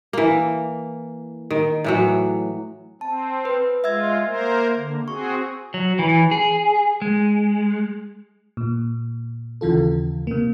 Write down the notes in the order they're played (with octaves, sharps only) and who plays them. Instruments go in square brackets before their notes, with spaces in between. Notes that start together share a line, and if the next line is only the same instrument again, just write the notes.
[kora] E3 A#3
D#3
A2 E3 F#3
[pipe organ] C4 [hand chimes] A5
[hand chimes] B4
[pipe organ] G#3 F4 [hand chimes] E5 E6 G#6
[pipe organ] A#3 A#4 C5
D3 A#3
[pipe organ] C4 F#4 G#4 [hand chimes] C#6
[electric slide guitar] F#3
E3
G#4
G#3
[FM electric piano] A#2
D#2 C#3 E3 F4 A4
C3 A#3